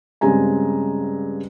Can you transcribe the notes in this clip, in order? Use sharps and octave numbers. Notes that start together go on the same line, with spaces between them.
G2 C#3 G#3 C4 G#5 A#5